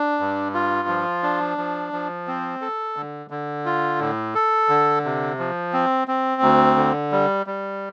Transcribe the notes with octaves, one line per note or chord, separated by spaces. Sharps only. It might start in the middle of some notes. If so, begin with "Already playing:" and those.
Already playing: D4
G2
F4
F3
D4
F3
F3
C4
A4
D3
D3
F4
A2
A4
D3
C3
F3
C4
C4
D2
D3
G3
G3